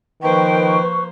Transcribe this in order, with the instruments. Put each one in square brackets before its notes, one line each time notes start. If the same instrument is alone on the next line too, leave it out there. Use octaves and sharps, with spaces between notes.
[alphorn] D#3 [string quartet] F3 A#3 C5 [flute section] B4 C#6 [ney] G5